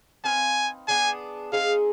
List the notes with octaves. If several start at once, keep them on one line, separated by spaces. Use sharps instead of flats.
C4 D#4 B4 F5 G#5
B3 D4 G#4 G#5
C4 D#4 G#4 F5